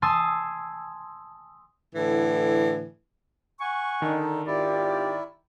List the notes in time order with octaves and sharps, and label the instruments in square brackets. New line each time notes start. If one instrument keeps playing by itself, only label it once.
[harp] G#5 A5 C6 D#6 E6
[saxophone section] A2 D3 E3
[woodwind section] F#5 G#5 C#6
[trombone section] D3 D4 D#4 [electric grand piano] D#3 [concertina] A4
[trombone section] G#1 F4 G4 [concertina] E4 [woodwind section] D5